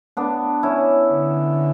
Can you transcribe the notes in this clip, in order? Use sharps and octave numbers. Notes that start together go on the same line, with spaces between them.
B3 D4
C#4 E4
D3